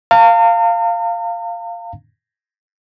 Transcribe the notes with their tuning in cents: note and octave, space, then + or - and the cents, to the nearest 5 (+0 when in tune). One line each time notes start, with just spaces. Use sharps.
F5 -5 A#5 -45